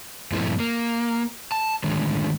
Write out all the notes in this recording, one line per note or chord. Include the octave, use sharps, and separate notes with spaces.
G2 A#2 F3 A3 C4 E4
A#3
A5
A2 D3 D#3 G#3